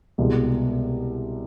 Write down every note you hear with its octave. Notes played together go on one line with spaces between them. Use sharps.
C2 B2 G#3